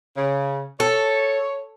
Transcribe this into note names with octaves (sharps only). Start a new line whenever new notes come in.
C#3
A4 C#5